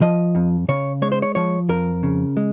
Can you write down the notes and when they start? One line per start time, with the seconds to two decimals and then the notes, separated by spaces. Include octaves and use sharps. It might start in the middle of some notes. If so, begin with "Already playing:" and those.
0.01 F3 D#5
0.35 F2
0.69 C#3 C#5
1.02 G#3 C#5
1.12 C5
1.22 C#5
1.35 F3 C#5
1.69 F2 A#4
2.03 C#3
2.37 G#3